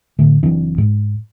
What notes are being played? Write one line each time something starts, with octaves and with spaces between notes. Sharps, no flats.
A2 D3 A3
F#1 E3 C4 D4
G#2